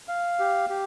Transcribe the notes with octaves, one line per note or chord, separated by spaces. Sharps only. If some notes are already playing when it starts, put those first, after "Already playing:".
F5
G4
G4